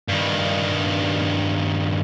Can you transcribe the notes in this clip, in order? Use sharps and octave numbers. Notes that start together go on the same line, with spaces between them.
G2 D#3